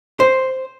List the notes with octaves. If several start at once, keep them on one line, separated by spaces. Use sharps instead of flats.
C5